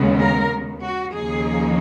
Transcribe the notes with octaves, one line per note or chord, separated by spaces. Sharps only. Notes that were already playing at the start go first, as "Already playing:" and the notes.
Already playing: D#2 C#3 G#3 B3
A#4
F#4
D#2 C#3 F3 A#3 D#4 G#4